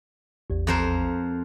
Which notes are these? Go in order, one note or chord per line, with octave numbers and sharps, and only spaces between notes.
A1 E2
F2 A#4 C5